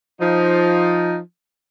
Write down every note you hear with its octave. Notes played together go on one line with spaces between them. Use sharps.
F3 D#4